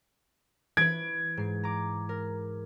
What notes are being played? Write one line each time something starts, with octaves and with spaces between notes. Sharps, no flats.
E3 B4 G#6 D7
G#2 C7
A#5 D6
A#4